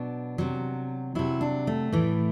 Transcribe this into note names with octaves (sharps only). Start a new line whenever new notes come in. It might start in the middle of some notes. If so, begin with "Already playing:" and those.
Already playing: B2 F#3 D4
C3 F#3
C3 F#3 E4
D4
A3
A2 E3